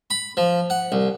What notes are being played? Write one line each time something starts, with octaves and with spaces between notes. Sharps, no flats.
B5
F3
F#5
C2